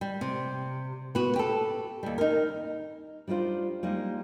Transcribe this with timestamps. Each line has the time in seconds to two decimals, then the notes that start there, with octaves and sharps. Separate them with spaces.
0.01 G3
0.21 C3
1.15 B3 F#4
1.36 G4 A4
2.03 D#2 G3
2.18 D#4 A#4
3.28 G3 D4 D#4 F4 C5
3.83 G3 G#3 A#3 D#4